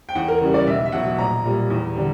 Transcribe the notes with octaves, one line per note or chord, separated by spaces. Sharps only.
G5
E2 F#5
A#4
C#3 E3 G3
D5
B1 E5
E5
B2 F#3 F#5
A#1 A#5
A#2 G3
E2
D3 G3